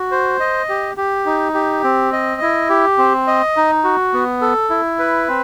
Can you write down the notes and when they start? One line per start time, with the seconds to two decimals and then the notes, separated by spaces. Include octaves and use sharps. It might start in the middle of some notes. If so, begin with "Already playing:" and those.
Already playing: F#4
0.12 C5
0.40 D#5
0.69 G4
0.97 G4
1.26 D#4
1.54 G4
1.84 C4
2.13 D#5
2.42 E4
2.69 G4
2.98 C4
3.27 D#5
3.56 D#4
3.84 F#4
4.14 B3
4.41 A4
4.70 E4
4.99 B4
5.28 C4